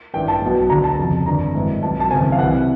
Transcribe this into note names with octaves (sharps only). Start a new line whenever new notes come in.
A1 G2 E3 G5
A5
B1 B2
D2 D3 A#5
A5
F1 F2 C#3 A#5
G#1 G2 D3 A#5
G#1 G#2 E3
B1 B2 A5
A5
G#1 F#2 C#3 E3 G#5
F5
C2 C3 E3 F#5